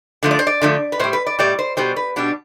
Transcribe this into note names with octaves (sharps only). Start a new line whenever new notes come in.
D3 F3 A3
D5
C5
D5
D3 F3 A3
B4
A2 G3 C5
B4
D5
A2 G3 D5
C5
B2 G3 C5
B4
B2 G3 D4